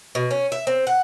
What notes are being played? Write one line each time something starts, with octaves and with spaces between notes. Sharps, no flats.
B2
C#4
E5
C4
F#5